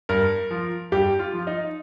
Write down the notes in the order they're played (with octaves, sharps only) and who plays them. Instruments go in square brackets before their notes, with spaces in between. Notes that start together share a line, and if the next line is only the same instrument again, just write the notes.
[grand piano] G2 A#4
F3
G2 G4
F4
F3
D#4